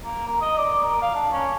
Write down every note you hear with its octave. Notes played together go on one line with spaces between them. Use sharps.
A#3
A#4
D#5
D5
A#4
F5
D4
C#4